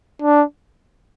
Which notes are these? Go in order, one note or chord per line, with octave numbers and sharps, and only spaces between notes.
D4